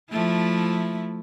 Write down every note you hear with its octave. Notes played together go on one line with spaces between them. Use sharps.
F3 A3 E4